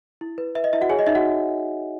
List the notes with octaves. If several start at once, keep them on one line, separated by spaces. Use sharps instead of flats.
E4
B4
B4 E5
D#5
E4 E5
F#4 F#5
G#4 C#5 G#5
D#5
D#4 E5
F#4 F#5